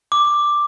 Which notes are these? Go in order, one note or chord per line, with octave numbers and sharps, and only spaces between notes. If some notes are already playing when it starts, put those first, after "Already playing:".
D6